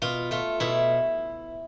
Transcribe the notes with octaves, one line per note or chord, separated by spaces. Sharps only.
B2 F4
A3 F4
B2 E4